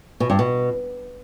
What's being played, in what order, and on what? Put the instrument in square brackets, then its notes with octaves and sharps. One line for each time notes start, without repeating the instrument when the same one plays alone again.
[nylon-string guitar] B2
G2
B2